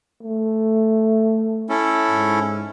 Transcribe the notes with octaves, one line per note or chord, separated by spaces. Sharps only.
A3
C#4 E4 A4
G#2